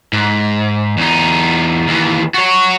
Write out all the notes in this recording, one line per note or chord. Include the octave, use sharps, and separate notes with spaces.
G#2
E2 D#4
D#2 E3
F#4 C#5